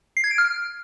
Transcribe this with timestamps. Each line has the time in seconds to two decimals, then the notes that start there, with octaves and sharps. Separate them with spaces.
0.17 C7
0.24 G#6
0.31 D7
0.38 F6